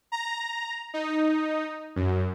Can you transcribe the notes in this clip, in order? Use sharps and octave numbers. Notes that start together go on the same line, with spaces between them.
A#5
D#4
F#2